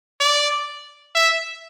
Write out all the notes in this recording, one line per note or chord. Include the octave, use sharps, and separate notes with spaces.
D5
E5